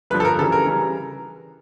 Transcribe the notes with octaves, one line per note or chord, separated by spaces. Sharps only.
G2 D3 F3 B4
A4
A#4
C#3 E3 G3 A4
A#4
C#3 E3 G3